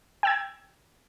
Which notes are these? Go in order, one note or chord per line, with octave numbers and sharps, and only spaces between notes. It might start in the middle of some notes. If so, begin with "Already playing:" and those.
G5 E6 G#6